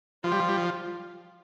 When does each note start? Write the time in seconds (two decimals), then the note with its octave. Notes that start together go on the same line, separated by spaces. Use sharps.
0.23 F3 F4
0.32 G3
0.40 F3
0.48 G3
0.57 F3